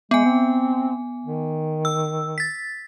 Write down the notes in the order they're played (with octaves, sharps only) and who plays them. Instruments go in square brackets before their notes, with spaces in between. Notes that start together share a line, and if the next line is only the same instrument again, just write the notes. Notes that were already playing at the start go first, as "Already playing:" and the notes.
[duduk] G#3 [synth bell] B3 G#5
[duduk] C4
D#3
[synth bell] E6
A6 B6